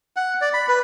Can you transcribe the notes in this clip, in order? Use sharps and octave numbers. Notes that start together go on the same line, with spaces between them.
F#5
D5
B5
B4